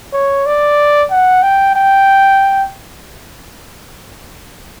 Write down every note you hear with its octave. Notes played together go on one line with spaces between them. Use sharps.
C#5
D5
F#5
G5
G5